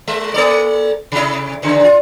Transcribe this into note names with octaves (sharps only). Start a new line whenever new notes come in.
G#3 E5
A#3 A4 D5
C3 E4
E2 C#3
F4